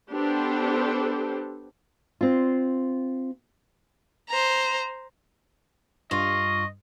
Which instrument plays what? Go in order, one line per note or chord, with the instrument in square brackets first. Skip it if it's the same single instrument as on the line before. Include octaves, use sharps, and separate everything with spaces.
[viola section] B3 D4 G4 A4 C5
[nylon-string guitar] C4 F4
[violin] C5 A#5
[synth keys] G2 [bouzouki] F4 [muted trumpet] D#5 [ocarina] C#6